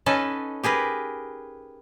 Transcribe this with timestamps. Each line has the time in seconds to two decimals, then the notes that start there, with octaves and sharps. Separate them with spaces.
0.06 C#4 D#4 A4 B4 G#5 A5
0.64 G4 G#4 A#4 B4